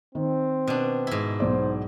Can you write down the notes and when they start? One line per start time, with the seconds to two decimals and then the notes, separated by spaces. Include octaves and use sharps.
0.15 D#3 C4
0.67 B2 D4
1.07 G#2 E4
1.40 B1 F#3 C5 D5